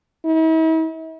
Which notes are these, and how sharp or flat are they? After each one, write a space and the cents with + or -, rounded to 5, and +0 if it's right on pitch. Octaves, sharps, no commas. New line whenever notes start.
E4 -45